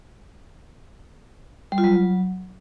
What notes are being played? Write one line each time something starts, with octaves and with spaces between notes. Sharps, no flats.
G3
F4
F#3